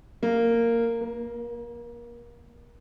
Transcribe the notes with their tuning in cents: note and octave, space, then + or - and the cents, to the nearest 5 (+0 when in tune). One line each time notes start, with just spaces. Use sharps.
A#3 -10
A#3 +30